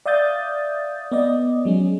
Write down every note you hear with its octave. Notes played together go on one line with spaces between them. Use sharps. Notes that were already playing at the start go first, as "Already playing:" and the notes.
D5 E5 F5 D#6 G6 A6
B3 D5 D#5
F#3 G#3 C#4